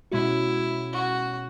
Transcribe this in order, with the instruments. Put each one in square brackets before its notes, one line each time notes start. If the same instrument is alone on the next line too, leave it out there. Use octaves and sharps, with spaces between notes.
[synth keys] B2 G#3 C#4 F#4 [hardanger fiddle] E4
[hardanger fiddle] F#4